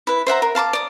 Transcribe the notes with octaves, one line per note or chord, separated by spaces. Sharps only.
E4 B4
C5 E5 F#5 A#5
A#4
F5 A5 C6 D6
D5 D#6